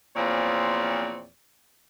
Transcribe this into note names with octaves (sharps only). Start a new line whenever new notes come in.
E2 A#2 F3 C4 C#5 D5